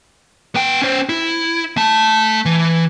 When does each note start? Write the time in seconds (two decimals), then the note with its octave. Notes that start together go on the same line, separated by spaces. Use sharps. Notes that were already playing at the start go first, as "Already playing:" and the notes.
0.55 B3 G5
0.82 C#4 C5
1.09 E4
1.77 A3 A5
2.45 E3